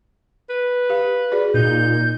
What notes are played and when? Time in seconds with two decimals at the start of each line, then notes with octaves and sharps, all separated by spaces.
0.49 B4
0.90 G4 F5
1.32 F#4 G#4 D5
1.54 A#2 D#4 G6